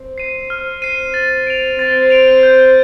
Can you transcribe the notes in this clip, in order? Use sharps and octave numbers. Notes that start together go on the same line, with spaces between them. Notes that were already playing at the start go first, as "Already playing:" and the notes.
Already playing: C4
C7 D#7
F6
C7 D#7
A6
D7 F7
C4 A6
D7 F7
G6